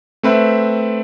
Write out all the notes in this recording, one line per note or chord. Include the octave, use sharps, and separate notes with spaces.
A3 C4 B4 E5